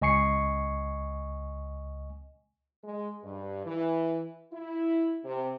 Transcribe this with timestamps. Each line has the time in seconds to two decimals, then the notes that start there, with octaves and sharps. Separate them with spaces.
0.02 C#2 D#5 G#5 C#6 C7 C#7
2.84 G#3
3.23 G2
3.66 E3
4.53 E4
5.25 C3